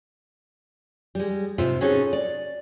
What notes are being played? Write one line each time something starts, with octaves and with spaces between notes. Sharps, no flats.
G3 G#3
G#2 C3 F4 C5 E5
C4 C#4 D#4 F#4 G#4 A4
D5